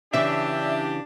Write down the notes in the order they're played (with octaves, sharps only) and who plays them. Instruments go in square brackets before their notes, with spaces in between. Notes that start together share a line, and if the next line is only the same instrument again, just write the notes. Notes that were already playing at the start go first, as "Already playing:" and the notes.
[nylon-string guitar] C#3 E3 [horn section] D4 G4 [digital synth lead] E5